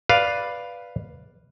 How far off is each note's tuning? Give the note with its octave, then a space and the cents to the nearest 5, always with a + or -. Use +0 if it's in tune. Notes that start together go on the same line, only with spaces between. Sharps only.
B4 +0 D5 +0 F5 +0